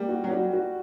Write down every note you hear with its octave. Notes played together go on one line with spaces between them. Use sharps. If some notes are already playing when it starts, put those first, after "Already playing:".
Already playing: G3 A#3
F#4
F#3
G3 F#4
F#4